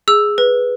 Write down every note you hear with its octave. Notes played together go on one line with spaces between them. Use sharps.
G#4 E6
B4